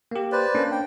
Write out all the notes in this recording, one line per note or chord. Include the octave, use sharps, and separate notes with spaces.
A#3 G4
B4 C5 D5
A#3 C#4 D4
G5